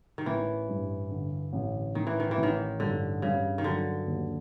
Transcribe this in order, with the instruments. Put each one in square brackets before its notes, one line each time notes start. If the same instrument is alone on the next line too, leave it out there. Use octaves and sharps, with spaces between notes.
[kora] D#3
[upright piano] A1 [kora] E3
[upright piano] G2
D3
A1
[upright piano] A1 [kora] D#3
[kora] E3
D#3
E3
[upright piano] A1
[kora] D#3
[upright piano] G2 [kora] D3
[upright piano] G2 [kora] C#3
[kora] D#3
[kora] D3 [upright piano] F#3
[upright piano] D#2